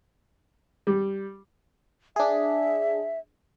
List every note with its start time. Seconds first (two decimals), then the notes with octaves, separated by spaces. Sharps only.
0.87 G3
2.16 D4 G#4 E5